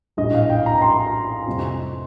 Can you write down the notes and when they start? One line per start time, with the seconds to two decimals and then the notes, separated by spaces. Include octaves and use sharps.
0.17 A#1 A2 G3 D#5
0.34 F5
0.49 G5
0.66 A#5
0.78 A#5
0.82 C6
1.47 F2 C3 G3